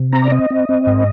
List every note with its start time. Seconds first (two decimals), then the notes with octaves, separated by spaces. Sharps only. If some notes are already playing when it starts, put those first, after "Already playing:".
Already playing: C3
0.13 C4 A#5
0.22 D5
0.32 C4 D#5
0.50 C4
0.69 C4
0.87 G#2